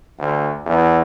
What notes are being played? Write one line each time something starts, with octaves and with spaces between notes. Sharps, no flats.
D2
E2